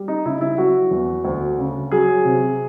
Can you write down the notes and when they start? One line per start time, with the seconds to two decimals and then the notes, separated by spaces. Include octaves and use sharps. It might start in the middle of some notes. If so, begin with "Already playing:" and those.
Already playing: G3
0.08 D#4
0.26 C#3 E4
0.41 E4
0.58 F#3 F#4
0.91 E2
1.24 D2
1.58 C#3
1.92 F#3 G#4
2.25 C3